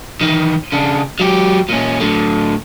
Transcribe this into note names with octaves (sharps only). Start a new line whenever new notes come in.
D#3 E3
C#3 D4
F#3 G4
A#2 C#4
A2 D3